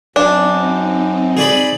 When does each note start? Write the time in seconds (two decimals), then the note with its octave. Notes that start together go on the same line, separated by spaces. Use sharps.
0.16 F#2 C4 D4 D#4
1.37 G#4 D5 B5